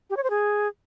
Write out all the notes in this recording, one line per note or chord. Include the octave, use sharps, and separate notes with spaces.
G4
C#5
C5
G#4